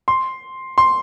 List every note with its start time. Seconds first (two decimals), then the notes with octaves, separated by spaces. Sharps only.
0.08 C6
0.78 C6